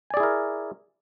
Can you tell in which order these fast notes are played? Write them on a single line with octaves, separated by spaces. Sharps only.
G#5 D5 G#4 E4 A#4